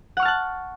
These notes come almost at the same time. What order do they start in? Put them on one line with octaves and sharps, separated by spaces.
F#5 C#6 F6 A5 F#6